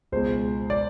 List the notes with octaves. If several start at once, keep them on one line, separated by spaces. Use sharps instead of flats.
C#2 B2 G#3 C5
D5